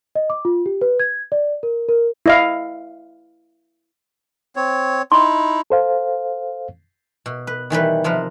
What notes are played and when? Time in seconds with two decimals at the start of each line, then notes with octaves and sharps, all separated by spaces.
0.15 D#5
0.30 D6
0.45 F4
0.66 G4
0.81 B4
1.00 G#6
1.32 D5
1.63 A#4
1.89 A#4
2.26 E4 D#5 F5
4.56 C4 C#5
5.12 D#4 E4 C6
5.70 A4 C5 F5
7.26 B2
7.47 B4
7.70 D#3 E3 G3 B4
8.04 C3 F3 A#4 B4